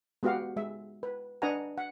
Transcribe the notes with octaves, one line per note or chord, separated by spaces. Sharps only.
G#3 B3 F#4 G4 F5 F#5
G#3 E5
B4
D4 B4 D#5 F#5 G#5 A#5
F#5